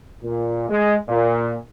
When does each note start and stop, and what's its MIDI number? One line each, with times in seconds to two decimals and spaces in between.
0.23 0.66 46
0.69 0.95 56
1.09 1.55 46